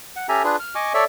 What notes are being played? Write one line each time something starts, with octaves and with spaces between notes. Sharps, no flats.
F#5
C#4 G4 A4 E5 G#5 A#5
D4 F4 G#4 B4
F6
D#5 G#5 C#6 D6
A4 C#5 D5 E5